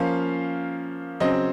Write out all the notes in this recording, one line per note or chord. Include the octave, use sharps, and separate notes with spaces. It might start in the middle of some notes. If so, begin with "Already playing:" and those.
Already playing: F3 A#3 C#4 F5
C#3 F#3 C4 D#5